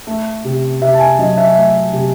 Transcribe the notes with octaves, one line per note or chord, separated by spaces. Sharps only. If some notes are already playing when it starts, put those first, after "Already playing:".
A3
C3
C3 E5
A5
G#5
F#3 D#5
E5
A3 E5
C3